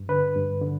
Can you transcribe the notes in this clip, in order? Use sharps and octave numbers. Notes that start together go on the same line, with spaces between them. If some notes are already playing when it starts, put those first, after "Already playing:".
Already playing: G2
D3 B4
G2
D3